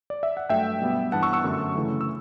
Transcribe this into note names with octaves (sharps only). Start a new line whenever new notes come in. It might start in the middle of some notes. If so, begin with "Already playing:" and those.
D5
E5
F#5
G2 F#3 A3 E5 G5
B2 G3 B3
G2 E3 B3 F#5 A5
C#6 E6
C#6 E6
F#2 D3 A3
C#3 E3 A3
E6